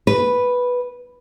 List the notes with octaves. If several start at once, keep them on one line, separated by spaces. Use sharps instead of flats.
B4